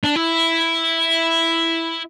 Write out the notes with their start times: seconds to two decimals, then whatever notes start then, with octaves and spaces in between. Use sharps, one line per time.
0.04 D4
0.16 E4